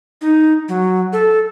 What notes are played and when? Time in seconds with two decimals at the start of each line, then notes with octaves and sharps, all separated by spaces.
0.21 D#4
0.68 F#3
1.13 A4